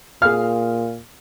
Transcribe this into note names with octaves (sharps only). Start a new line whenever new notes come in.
A#2 G#4 F5 F6